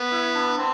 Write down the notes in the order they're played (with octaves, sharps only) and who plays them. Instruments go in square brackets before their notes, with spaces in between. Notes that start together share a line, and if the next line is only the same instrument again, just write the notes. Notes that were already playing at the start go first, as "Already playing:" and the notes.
Already playing: [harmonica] B3
[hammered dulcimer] E4
D4
[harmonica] C4 [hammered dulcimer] D4